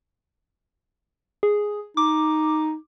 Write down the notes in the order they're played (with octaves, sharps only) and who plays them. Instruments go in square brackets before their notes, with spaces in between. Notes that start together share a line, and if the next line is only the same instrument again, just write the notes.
[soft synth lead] G#4
[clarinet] D#4 [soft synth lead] D6